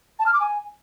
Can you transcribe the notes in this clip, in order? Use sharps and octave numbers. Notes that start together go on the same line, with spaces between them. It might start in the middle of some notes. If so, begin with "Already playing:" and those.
A5
F6
D6
G#5